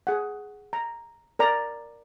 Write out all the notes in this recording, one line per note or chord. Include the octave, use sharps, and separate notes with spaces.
G#4 F#5
A#5
A#4 D5 A#5